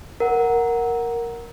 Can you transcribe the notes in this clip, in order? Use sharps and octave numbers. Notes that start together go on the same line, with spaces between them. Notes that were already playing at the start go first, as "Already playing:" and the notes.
A#4 F#5